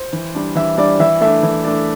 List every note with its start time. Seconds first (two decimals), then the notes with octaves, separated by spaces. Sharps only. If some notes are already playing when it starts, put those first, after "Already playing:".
Already playing: C5
0.13 E3
0.35 G3 D4
0.55 E3 E5
0.78 G3 D4 D5
0.99 E3 E5
1.21 A3 D4 E5
1.43 E3
1.64 A3 D4